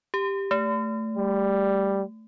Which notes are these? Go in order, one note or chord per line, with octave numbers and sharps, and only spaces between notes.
G4
A3
G3